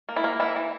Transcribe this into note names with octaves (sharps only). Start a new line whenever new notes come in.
A#3
E4
A#3
E3 E4
E3